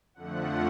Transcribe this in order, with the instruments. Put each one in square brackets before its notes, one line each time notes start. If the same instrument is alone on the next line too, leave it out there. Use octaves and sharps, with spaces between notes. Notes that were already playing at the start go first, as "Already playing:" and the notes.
[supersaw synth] F2 D3 F3 A3 F#5